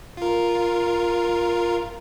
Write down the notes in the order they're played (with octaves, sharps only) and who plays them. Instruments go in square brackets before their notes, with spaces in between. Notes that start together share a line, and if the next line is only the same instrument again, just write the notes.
[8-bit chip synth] F4 A#4